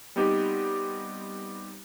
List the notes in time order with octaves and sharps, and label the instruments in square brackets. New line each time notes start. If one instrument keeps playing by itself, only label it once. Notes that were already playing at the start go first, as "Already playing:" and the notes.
[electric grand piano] G3 B3 C4 D#4 G4